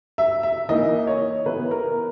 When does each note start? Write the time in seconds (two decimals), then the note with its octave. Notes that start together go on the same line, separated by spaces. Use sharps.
0.18 E5
0.43 E5
0.69 E3 A#3 D#4 D#5
1.07 C#5
1.46 E3 B3 E4 B4
1.71 A#4